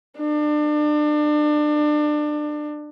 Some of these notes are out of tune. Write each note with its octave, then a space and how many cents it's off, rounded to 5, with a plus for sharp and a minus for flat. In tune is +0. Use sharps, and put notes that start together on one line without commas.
D4 +30